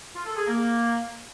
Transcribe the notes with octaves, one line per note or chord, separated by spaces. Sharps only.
F4
A4
G#4
A#3